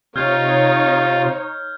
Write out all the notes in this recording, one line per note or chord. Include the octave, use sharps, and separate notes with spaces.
C3 D#4 F4 C#5 F6 G6 G#6